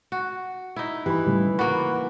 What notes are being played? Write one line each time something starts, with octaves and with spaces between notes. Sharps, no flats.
F#4
D#4 E4
E3 G4 B5
A2 C#3 G3
A#3 F#4 B5